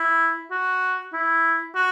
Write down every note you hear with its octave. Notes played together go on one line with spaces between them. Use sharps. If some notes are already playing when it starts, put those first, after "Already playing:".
Already playing: E4
F#4
E4
F#4